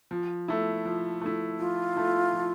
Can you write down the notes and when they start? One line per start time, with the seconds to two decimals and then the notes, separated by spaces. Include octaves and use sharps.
0.11 F3
0.48 A3 E4
0.85 F3
1.21 A3 E4
1.59 F3 F4
1.96 A3 E4
2.33 F3